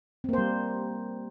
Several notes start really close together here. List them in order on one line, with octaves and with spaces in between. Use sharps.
C4 A#3 C5 G3